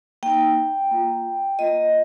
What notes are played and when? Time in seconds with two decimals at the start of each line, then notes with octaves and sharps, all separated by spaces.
0.23 A#3 D#4 G5
0.91 A#3 F4
1.59 A#3 F4 D#5